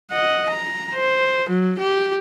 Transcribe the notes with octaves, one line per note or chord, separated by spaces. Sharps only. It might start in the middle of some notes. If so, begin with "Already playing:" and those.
D#5 F#5
A#5
C5
F#3
G4